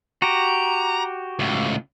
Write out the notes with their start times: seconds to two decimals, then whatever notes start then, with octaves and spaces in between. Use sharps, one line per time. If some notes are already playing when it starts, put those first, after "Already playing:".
0.22 F#4 G4 A#5
1.39 C#2 A2